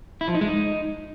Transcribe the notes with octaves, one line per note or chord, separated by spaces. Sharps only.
E4
F3
D#4
G#3
D#4